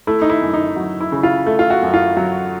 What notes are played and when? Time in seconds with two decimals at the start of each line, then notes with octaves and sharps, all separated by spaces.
0.07 A3 E4
0.22 D#4
0.30 E4
0.42 F#2
0.53 D#4
0.76 F#3
1.01 E4
1.12 C#3
1.23 F4
1.46 A3
1.59 F4
1.70 F#4
1.82 F#2
1.94 F4
2.17 F#3 F#4